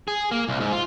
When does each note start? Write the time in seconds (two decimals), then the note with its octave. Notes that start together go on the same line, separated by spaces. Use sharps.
0.08 G#4
0.31 A#3
0.48 C2
0.61 G#2
0.72 F4